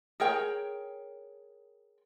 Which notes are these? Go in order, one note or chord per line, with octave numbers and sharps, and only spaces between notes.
G#4 A#4 C#5 G5